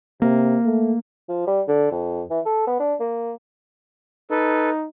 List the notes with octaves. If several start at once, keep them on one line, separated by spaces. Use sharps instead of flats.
C3 A#3
A3
F3
G3
D3
F2
E3
A4
B3
D4
A#3
D#4 A4 B4